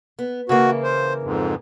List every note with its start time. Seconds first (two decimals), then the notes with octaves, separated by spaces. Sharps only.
0.19 B3
0.49 C#3 E3 A#3 F#4
0.83 C5
1.22 F2 G#2